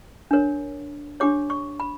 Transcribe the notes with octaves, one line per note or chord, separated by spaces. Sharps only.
D4 A#4 C#5
D4 G4 C#5 D6
C#6
B5